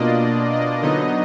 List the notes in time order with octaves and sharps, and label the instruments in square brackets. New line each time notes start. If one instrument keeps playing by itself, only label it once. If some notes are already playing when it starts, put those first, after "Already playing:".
Already playing: [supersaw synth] B2 A#3 D4 F4 D5 D#5
D#5
D3 F#3 B3 D#4 D#5